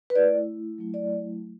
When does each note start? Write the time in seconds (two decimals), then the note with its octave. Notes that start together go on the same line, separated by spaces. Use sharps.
0.10 B4
0.15 A3 E4 D5
0.78 F#3 A3 E4
0.94 D5